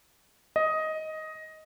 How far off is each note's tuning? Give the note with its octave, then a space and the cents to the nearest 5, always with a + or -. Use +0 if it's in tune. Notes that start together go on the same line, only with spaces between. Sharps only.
D#5 +10